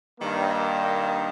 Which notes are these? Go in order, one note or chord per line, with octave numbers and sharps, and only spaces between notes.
G2 D#3 A#3